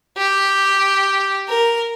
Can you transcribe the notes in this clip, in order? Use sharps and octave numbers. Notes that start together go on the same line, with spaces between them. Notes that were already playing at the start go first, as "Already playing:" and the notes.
G4
A#4